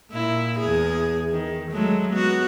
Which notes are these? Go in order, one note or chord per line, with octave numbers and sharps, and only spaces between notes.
A#2 E4
E2 G#4
D#3
F#3 G#3 A3
B3 F#4